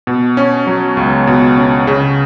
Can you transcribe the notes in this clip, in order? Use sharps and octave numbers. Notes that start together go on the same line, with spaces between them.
B2
C#4
F#3
C#2
B2
C#4
C#3